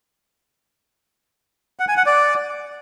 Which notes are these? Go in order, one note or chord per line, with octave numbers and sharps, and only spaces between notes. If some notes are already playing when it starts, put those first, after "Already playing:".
F#5
G#5
F#5
D5